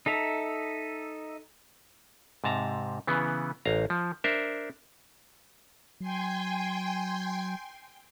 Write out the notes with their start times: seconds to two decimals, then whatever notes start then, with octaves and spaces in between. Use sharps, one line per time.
0.06 D#4 A4 E5 A#5
2.44 G#2 C3 A5 A#5
3.07 C#3 E3 B3
3.65 A1 F5 A#5
3.90 F3
4.24 D4 A#4 C5 E5
6.00 F#3 G5 G#5 C6